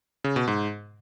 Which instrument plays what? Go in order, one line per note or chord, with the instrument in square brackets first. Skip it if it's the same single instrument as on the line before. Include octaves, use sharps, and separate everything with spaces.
[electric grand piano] C#3
B2
G#2